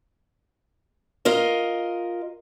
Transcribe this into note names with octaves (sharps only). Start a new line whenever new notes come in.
F4 A#4 D#5